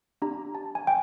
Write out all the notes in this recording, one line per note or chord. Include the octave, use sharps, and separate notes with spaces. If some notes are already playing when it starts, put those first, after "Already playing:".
D4 G4 A#5
A5
G#5
G5